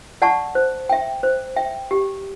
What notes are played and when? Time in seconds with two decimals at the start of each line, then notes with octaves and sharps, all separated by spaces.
0.22 D5 F#5 A5 C#6
0.55 C5
0.89 E5 G5
1.23 C5
1.56 E5 G5
1.91 G4